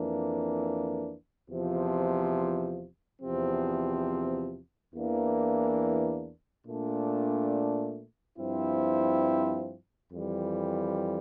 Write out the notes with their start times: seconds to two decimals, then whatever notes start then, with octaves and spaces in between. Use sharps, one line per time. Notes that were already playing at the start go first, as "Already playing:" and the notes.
Already playing: F2 E3 A#3 D4
1.50 E2 C3 F3
3.22 E2 C3 F3 C4
4.94 E2 E3 A#3 D4
6.66 A#2 A3 D4
8.38 G2 F3 C4 E4
10.11 F2 E3 G3